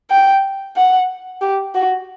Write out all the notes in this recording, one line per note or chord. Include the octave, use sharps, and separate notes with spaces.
G5
F#5
G4
F#4